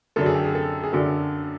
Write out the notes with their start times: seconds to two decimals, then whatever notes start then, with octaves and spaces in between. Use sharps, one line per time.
0.16 F#2 D3 F#3 A4
0.26 G#4
0.35 G4
0.44 G#4
0.55 A4
0.83 G#4
0.92 F#2 D3 F#3 A4